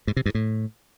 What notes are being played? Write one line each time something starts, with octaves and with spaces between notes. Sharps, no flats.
G#2
C3
G2
A2